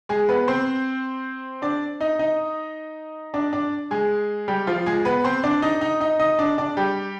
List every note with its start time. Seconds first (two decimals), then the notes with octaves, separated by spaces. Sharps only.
0.09 G#3 G#4
0.29 B3 B4
0.48 C4 C5
1.62 D4 D5
2.00 D#4 D#5
2.19 D#4 D#5
3.34 D4 D5
3.53 D4 D5
3.91 G#3 G#4
4.48 G3 G4
4.67 F3 F4
4.86 G#3 G#4
5.05 B3 B4
5.24 C4 C5
5.44 D4 D5
5.62 D#4 D#5
5.81 D#4 D#5
6.00 D#4 D#5
6.20 D#4 D#5
6.39 D4 D5
6.58 D4 D5
6.77 G3 G4